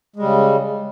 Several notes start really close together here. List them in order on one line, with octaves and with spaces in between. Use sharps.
G#3 G3 C#3